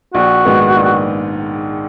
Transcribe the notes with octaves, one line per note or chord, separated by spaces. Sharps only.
A#1 F#4
G#2 D#3 G#3 B3
A#1